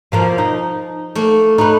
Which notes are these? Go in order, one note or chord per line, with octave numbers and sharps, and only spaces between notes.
B2 F3 A#3
D#4
A3 A#3
A3 D#4 B4